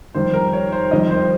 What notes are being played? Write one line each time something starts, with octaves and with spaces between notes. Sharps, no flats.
F2 D#3 G3 C5
A#4
C#5
C5
F2 D#3 G3 D#5
C5